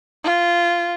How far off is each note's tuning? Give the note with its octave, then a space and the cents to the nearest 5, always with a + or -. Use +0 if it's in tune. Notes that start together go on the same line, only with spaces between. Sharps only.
F4 -15